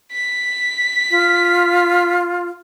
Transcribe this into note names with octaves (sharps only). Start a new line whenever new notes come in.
B6
F4